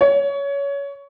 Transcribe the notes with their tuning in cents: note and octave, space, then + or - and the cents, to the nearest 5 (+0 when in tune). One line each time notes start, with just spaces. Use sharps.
C#5 +20